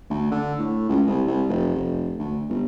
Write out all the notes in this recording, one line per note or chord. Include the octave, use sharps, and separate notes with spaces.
D2
D3
A2
C#2
C2
C2
F1
F1
D2
G1